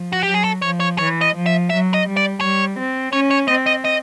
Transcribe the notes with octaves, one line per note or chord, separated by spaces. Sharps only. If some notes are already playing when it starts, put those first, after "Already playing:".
Already playing: F3
F#4
F#3 G4
G#4
A4
F3 C#5
C#5
E3 C#5
D#5
F3
E5
F#3 E5
D#5
G3
D5
G3 C#5
C4
C#4 C#5
C#5
C4 D#5
D#5
D#5